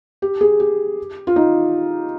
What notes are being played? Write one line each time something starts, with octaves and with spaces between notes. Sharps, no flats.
G4
G#4
G4
F4
D#4